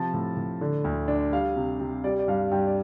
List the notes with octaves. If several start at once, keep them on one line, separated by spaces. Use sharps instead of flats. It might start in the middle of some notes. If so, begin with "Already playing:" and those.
Already playing: C3 F3 A5
A2
A2
D3
D2
D4
G3 F5
C3
C3
G3 D5
D5
G2 F5
G2 G5
D5